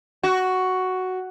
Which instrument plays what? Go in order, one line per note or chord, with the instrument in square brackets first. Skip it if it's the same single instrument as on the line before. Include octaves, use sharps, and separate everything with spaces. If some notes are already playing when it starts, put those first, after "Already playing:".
[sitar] F#4